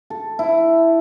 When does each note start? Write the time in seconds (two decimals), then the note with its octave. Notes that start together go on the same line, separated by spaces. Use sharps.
0.10 A4
0.39 E4